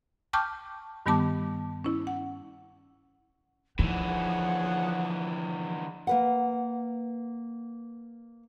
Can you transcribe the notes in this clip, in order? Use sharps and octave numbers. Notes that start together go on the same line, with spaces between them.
G5 A5 C#6 D6 F6 G6
G2 D#3 G3 B3 A5 D6
C#4 E4
F#5
D3 E3 F3 D#4 G#4 C#5 F#5
A#3 B4 F#5